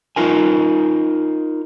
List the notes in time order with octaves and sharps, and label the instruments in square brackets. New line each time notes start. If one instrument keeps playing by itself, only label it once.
[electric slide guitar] D#4 F4 A#4 G#5